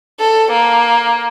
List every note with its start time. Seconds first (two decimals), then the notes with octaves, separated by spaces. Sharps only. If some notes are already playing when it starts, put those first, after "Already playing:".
0.20 A4
0.52 A#3